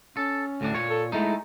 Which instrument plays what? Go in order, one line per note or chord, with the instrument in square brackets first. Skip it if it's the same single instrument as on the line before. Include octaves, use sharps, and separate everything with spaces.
[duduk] C#4 [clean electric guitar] A4
[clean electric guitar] D2 A2 D4
A#2 C#5
[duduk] A4
[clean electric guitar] G#3 A3 D#4 [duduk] E4